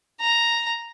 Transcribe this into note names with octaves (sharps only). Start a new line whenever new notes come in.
A#5